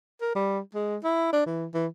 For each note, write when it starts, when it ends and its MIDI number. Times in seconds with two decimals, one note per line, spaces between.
0.21 0.30 70
0.35 0.59 55
0.75 0.96 56
1.04 1.29 64
1.33 1.45 62
1.46 1.67 52
1.74 1.87 52